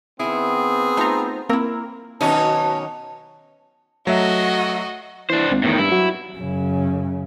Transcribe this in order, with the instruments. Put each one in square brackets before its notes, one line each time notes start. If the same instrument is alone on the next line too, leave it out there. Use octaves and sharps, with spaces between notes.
[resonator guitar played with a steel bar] D#3 E4 [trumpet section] B3 C4 [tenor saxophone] G#4
[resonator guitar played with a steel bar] A3 D#4 F4 [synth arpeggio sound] C5 A#5
[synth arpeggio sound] A#3 A#4 [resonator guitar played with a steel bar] C4 E4
[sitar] B2 C#4 D#4 [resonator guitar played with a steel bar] D#3 F#3 D#5 [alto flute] A5
[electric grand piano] F#3 A3 E5 [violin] F#4 D#5
[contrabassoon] E3 [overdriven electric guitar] D4 C5
[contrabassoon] G#1
[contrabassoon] E2 [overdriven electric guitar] A2 D#3
[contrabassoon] G2 [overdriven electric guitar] E4
[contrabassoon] F#3
[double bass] F#2 C#3